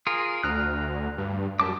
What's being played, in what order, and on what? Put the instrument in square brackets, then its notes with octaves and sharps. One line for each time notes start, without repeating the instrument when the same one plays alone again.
[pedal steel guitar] F4 G#4 A#4
[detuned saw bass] D2 [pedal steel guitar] A#5 F6 F#6
[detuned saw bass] G2
[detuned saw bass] F#2 [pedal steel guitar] G4 A5 D6